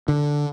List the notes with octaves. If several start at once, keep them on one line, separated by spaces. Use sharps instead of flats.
D3